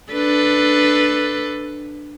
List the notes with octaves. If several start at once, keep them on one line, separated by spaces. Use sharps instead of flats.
D4 A4 B4